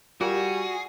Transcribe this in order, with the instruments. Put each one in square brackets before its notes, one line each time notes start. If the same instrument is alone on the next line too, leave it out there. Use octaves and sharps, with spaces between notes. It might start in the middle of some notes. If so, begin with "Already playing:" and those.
[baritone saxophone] G3 [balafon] F4 A#4 F5 [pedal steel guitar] F#4 [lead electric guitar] G#4